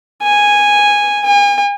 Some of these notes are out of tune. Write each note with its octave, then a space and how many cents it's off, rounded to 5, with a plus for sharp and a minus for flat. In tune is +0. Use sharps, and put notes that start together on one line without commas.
G#5 -10
G#5 -40